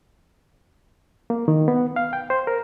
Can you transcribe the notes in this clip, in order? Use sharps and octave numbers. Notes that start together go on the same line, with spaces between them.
A#3
D#3
B3
F5
G5
C5
A#4